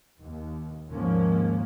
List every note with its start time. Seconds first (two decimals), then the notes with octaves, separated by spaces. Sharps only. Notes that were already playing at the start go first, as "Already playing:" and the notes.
0.21 D#2
0.89 D#2 G#2 F3 A#3 C#4